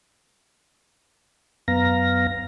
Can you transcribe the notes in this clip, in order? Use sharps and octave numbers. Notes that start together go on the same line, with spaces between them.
F#2 B3 F5 A#5 A#6